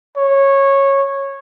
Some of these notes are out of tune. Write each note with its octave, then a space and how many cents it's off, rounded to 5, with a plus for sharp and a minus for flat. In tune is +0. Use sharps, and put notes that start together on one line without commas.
C#5 -15